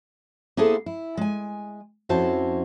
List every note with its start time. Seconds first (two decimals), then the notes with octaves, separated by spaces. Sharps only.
0.57 A#3 B3 E4 G#4 A4 C5
0.86 E4
1.17 G#3 G#5
2.09 F2 C#4 E4 F#4 C5 A5